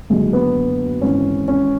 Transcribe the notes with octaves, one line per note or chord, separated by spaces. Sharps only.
F#1 F#2 D3 G#3
B3
G#1 G#2 E3 C#4
C#4